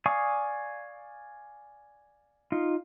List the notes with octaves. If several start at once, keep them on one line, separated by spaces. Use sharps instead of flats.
D5 F5 G#5 C#6 D#6
D#4 F4